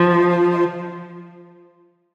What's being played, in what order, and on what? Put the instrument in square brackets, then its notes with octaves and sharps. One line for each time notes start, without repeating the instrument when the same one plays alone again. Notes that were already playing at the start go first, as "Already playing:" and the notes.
Already playing: [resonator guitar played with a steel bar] F3